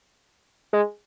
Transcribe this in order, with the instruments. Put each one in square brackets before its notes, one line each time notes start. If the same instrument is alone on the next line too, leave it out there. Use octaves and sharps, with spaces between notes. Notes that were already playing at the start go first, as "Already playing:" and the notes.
[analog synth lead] G#3